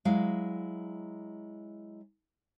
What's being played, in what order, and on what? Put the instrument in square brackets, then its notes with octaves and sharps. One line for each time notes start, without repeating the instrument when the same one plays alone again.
[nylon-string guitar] F#3 G#3 E4 F5